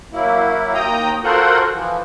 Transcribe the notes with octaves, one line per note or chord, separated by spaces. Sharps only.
F#3 A#3 E4
D#2 G5 A#5 D#6
F4 F#4 A4 A#4 C5 F#5
E3 F3